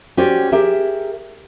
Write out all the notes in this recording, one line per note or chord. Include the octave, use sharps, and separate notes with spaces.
C#4 F#4 G4 C5 D5
G4 G#4 A#4 E5